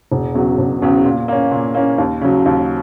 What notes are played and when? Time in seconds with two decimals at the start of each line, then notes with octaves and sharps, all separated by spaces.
0.12 E1
0.34 E2 C#3 F#3
0.58 E1
0.82 E2 C#3 F#3
1.06 A#2
1.28 A#3 C#4
1.51 A#2
1.75 A#3 C#4
1.98 D#2
2.21 C#3 F#3
2.46 D#2